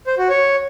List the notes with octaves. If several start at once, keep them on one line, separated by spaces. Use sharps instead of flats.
C5
F#4
C#5